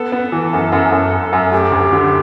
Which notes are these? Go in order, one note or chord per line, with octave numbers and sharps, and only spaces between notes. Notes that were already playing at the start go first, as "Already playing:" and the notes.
Already playing: B3 A4
B3
E3
F#2
F#2
F#2
F#2
F#2
A3 G4
D2
D3